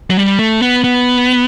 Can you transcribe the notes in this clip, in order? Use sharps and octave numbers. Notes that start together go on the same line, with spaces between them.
F#3
G3
A3
B3
B3